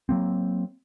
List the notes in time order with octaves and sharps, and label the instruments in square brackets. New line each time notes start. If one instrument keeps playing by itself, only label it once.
[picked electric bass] F#3 A#3 C4